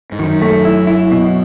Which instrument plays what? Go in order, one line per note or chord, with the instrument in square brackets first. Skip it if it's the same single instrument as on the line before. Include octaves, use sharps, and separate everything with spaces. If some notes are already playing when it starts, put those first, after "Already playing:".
[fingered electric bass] G#2
[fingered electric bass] F#2 [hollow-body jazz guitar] D#3
[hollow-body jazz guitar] A3
E4
E4
B2